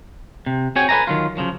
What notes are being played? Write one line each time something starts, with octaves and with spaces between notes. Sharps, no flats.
C3
C4 F#4 G#4 C#5 G5 G#5
A4 B4 D#5 G#5 A#5
D#3 F#3 F4
C#3 F3 F#3